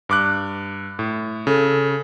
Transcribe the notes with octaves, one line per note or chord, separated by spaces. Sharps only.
G2 D6 F#6
A2
C#3 A4